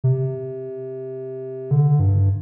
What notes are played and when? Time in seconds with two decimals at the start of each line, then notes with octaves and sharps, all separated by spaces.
0.04 C3
1.71 D3
2.00 G2